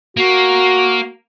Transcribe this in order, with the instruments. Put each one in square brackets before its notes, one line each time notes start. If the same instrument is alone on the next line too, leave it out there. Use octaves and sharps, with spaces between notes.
[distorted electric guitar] A#3 [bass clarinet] F#4